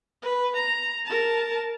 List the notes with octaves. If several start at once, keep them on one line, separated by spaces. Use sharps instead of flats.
B4
A#5
A#4 A5